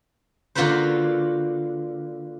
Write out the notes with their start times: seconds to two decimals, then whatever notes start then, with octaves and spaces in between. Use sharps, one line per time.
0.55 D3 A#3 F4 F#4 B4 C5